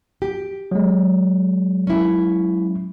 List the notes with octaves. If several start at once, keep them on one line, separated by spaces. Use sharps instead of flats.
G4
F#3 G#3
C#4 E4